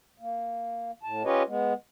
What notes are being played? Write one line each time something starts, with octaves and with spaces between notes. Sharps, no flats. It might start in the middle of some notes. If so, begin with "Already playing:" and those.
A#3
A2 A5
C#4 F4 G4 B4 C#5 D#5
G#3 B3